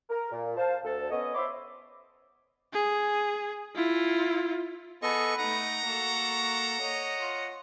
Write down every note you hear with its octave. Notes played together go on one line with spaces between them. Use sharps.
A#4
A#2
C5 F5 A5
D2 A4
B3 C#4 C#5 D#5
C5 C#5 E5 B5 C6 D6
G#4
E4 F4
B3 G#4 A4 B4 D#5 C#6
A3 D#4 F#5 A#5
A#3 F#4 A4
C#5 D#5
F4